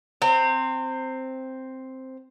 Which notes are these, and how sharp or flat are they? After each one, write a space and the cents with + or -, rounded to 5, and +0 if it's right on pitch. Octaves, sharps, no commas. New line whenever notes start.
C4 +0 A#5 -35